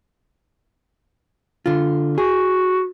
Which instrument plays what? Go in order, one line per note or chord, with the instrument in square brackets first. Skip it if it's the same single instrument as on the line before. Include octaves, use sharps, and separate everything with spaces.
[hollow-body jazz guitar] D3 F4
[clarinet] F#4 [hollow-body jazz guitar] G#4